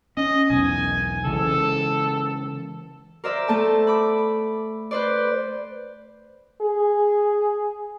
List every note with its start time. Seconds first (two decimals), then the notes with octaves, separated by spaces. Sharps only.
0.17 C#4 D#5
0.50 B1 E2 G#5
1.25 C#3 E3 G#3 A4
3.24 A#4 C5 D5 E5
3.48 A3 A4 A5
3.87 B5 D6
4.91 B4 C5 D5
6.61 G#4